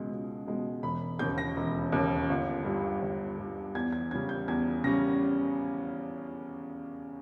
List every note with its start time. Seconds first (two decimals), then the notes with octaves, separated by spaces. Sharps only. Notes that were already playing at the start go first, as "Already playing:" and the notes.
Already playing: C#2 B2 G#3
0.10 C#2
0.46 B2 G#3
0.83 E1 B5
1.19 D#2 C#3 G6
1.38 A#6
1.56 E1
1.92 D#2 C#3
2.29 G1
2.65 G2 G3
3.02 G1
3.38 G2 G3
3.75 E2 G#6
3.93 G#6
4.11 C#3 G3 C#4 G#6
4.29 G6
4.48 E2 G#6
4.84 C#3 G3 C#4 A#6